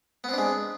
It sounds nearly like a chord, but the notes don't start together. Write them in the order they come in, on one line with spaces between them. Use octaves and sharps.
B3 C4 D4 G#3